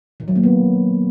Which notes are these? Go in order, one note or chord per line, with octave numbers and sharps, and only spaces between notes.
D#3
F#3
A#3
B3